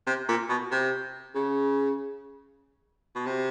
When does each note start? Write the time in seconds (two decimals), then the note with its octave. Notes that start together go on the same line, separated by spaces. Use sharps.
0.07 C3
0.29 A#2
0.49 B2
0.71 C3
1.35 C#3
3.15 B2
3.27 C3